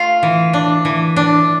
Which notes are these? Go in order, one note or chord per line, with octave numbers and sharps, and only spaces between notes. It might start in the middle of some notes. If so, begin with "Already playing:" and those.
Already playing: A3 F4 F5
E3
D4
E3
D4